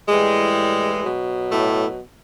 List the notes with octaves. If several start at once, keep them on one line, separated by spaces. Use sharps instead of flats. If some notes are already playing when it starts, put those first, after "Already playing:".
A2 E3 G3 G#3
B2 F#3
A2 A3